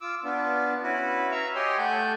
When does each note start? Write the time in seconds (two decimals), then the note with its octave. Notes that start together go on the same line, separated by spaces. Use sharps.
0.01 F4 D6 E6
0.24 B3 D4 F4
0.83 C#4 E4 F#4 B4
1.31 E5 F5 A#5 C#6 E6
1.55 G4 C#5 D#5 G5 G#5 C6
1.78 A3 F#5 G#5 A5 G6